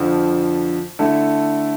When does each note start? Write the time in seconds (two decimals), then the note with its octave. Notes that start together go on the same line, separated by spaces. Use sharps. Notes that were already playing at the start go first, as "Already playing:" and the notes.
Already playing: F2 D3 F3
0.99 D3 A3 E4